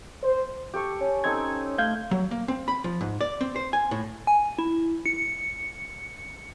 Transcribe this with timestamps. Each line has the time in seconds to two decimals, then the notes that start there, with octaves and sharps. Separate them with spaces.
0.23 C5
0.74 G4 A4 C#6
1.01 C#4
1.24 C4 D#4 A4 G#6
1.78 A3 F5 G6 G#6
2.11 F#3
2.31 A#3
2.48 C4
2.68 B5
2.84 F3
3.01 G#2
3.21 D5
3.41 C4
3.56 C5
3.73 G#5
3.91 A2
4.27 G#5
4.59 E4
5.06 C#7